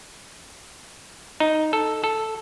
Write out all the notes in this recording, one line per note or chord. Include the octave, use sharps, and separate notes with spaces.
D#4
A4
A4